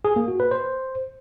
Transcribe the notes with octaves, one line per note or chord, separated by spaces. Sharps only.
G#4
A#3
F#4
B4
C5